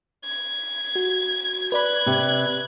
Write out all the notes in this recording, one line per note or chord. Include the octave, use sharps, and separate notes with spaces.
G#6
F#4
B4 D5 B5 F#6 G#6
C3